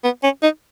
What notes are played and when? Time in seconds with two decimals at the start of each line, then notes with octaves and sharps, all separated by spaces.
0.04 B3
0.23 C#4
0.42 D#4